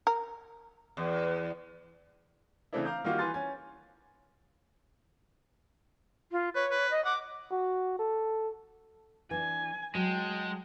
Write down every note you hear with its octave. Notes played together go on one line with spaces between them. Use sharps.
A#4
E2
C#3 E3 A3 C4 D4 E4
F5 A#5 D6 G6
D#3 G3 A#3 F4 F#4
E3 B4 G#5 C6 A6
C#4 G#5
F4
B4 C#5
B4
D#5
F#5 D6
F#4
A4
E3 D4 G#5
F#3 G#3 G5 A5